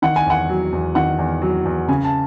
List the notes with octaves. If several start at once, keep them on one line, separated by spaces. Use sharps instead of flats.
D#3 F#5
G#5
E2 F#5
F#3
E2
D#3 F#5
E2
F#3
E2
C#3 G#5
A5